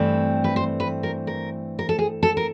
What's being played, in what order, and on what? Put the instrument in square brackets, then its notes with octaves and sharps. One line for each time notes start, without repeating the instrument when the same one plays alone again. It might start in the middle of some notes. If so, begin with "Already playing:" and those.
Already playing: [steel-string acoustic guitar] G2 E3 A3 C4
B4
C5
B4
A#4
A#4
A#4
A4
G#4
A4
A#4